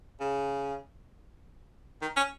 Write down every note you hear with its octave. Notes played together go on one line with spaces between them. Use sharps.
C#3
D#3
C#4